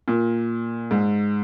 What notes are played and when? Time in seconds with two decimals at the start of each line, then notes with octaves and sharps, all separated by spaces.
0.08 A#2
0.91 G#2